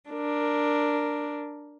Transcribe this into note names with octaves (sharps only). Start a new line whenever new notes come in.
D4 A#4